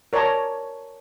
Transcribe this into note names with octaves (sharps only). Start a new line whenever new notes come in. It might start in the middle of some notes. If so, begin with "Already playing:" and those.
A#4 C#5 D5 A5 A#5